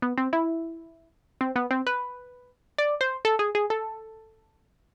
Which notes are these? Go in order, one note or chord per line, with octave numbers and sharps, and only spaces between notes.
B3
C4
E4
C4
B3
C4
B4
D5
C5
A4
G#4
G#4
A4